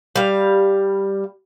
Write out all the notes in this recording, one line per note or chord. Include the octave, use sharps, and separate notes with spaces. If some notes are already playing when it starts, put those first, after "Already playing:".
G3 F5